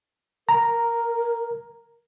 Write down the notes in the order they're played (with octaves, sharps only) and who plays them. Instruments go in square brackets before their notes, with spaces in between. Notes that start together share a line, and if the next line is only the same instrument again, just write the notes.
[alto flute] A#4 [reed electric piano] A#5